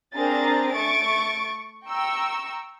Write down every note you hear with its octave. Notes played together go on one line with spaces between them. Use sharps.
C4 D4 G#4 A#4 A#5 A6
A3 C#6 A6 D7
G5 A#5 C#6 E6